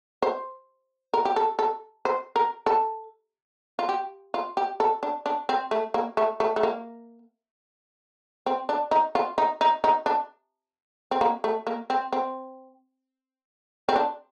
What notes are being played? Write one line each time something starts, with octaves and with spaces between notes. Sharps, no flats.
C5
A#4
G4
A4
A4
C5
A#4
A4
F4
G4
F4
G4
A4
D4
D4
C4
A3
A#3
A3
A3
A3
A#3
C4
D4
D#4
F4
D#4
D#4
D#4
D4
C4
A#3
A3
A#3
C4
C4
C4
D4